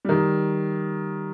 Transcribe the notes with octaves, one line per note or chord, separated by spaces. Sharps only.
D#3 G3